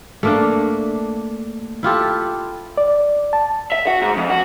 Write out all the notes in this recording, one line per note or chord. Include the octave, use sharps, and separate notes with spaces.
A3 A#3 D4
E4 F4 G4 A4
D5
A5
E5
F#4
G#2
F2
F#4